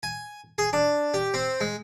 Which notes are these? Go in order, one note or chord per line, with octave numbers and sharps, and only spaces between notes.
G#5
G#4
D4
G4
C4
G#3